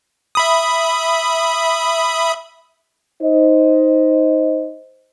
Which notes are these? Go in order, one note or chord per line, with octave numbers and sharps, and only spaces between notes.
E5 B5 D#6
D#4 C5 D#5